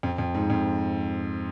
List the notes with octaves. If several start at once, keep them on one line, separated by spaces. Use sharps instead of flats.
F2
F2
G#2
F2